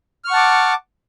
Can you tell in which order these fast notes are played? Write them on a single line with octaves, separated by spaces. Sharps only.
F6 C#6 F#5 A5 D6